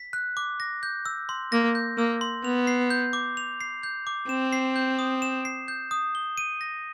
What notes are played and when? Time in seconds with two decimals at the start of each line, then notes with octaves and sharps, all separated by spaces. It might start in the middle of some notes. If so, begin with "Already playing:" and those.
Already playing: B6
0.13 F#6
0.37 D6
0.60 A#6
0.83 G6
1.06 E6
1.29 C6
1.52 A#3 A#6
1.75 G6
1.98 A#3 E6
2.21 C6
2.44 B3 F7
2.67 C7
2.90 G6
3.13 D6
3.37 F7
3.61 C7
3.83 G6
4.07 D6
4.29 C4 E7
4.53 C7
4.76 G6
4.99 D#6
5.22 E7
5.45 C7
5.68 G6
5.91 D#6
6.15 G7
6.38 D#7
6.61 A#6